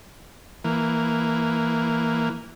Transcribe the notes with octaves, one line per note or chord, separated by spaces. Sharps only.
E3 A#3